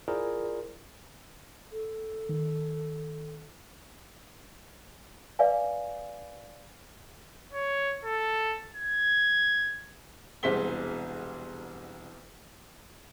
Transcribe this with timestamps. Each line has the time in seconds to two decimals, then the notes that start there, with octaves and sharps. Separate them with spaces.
0.08 E4 F4 G#4 A#4 C5 D5
1.72 A4
2.29 D#3
5.39 B4 D5 E5 F5 G#5
7.54 C#5
8.05 A4
8.76 G#6
10.43 E1 C2 G#4 C5 B6 G7